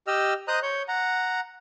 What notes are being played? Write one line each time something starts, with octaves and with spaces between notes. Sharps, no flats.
G4 D#5 E6 F6
C5 D#5 A#5 D#6 F#6
C#5 G6
F#5 A#5